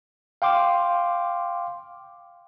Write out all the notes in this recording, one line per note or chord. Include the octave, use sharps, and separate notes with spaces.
F5 G5 C6 D6